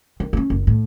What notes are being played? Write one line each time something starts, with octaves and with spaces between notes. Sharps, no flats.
D#3
C#4 D4
F#1
A2